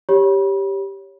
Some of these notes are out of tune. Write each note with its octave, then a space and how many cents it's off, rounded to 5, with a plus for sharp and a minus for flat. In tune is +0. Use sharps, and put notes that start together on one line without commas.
G4 +0 C#5 +0 B5 -35